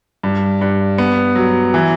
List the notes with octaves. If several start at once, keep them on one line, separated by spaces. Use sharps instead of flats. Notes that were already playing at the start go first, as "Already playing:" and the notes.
G2
G2
B3
F#3
E3